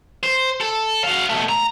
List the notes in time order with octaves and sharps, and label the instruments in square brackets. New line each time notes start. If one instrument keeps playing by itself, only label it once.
[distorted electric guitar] C5
A4
F#4 F5
B2 A3
A#5